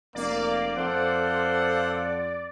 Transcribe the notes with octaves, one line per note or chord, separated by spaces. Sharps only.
F1 A#3 D5
F2 A4 C5 F5 F#5